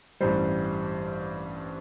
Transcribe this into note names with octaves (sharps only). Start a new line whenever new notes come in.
A1 G2 E3 G3 C5